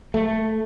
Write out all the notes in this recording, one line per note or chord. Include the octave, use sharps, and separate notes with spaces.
A3